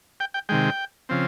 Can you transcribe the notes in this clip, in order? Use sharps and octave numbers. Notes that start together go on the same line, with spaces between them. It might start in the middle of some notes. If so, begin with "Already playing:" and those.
G5
G5
C3 D#3 G#3 G5
C#3 F3 C4